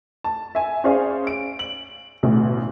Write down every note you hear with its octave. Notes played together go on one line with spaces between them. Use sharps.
A5
E5 G#5
C#4 G#4 C5 D5 F5
D7
F#7
A1 D2 B2